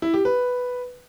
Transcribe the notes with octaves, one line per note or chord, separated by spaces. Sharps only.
E4
G4
B4